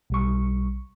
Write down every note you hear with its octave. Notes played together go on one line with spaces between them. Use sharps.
B1 G3 C#6